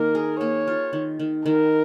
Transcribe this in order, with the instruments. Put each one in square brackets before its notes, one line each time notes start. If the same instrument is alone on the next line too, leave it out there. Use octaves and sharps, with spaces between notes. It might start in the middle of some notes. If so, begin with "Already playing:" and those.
Already playing: [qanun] D#3 A#3 [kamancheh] A#4
[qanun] G#4
[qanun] A#3 [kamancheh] C#5
[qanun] F4
D#3
D#3
[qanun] D#3 [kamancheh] A#4